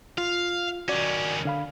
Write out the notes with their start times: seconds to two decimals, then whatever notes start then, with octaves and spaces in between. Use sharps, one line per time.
0.18 F4 F5
0.88 D#3 C#4 F#4 D5
1.45 D3 F5 B5